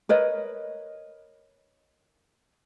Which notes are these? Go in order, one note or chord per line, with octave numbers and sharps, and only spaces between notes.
A#4 B4 C#5 D#5